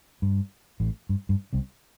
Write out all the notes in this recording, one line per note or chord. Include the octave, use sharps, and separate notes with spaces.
G2
A1 A2
G2
G2
C2 C3